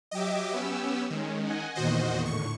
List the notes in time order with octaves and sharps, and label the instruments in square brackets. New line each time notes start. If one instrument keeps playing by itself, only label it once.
[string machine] F#3 E5 D6 [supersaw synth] G4 D#5
[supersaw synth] B3 C#4 [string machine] G4 E6
[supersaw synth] D#3 [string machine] G#3 C#4
[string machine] D#5 F#5 G#5
[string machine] E2 A#2 D#3 [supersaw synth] F#4 C5 D#5
[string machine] A2 D3 [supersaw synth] C#6